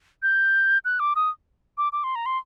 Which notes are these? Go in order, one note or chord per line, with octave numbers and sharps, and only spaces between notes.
G6
F#6
D6
D#6
D6
D6
C6
A#5
C6